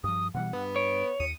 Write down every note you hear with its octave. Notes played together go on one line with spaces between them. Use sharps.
G2 F3 D#6
B2 E3 G3 F#5
G2 B3
C#5 D7
D#2 D#6 C#7